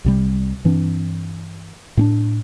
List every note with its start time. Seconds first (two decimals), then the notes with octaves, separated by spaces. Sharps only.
0.04 C2 C3 G3
0.64 G2 E3 C4 D4
1.97 A2 C4 D4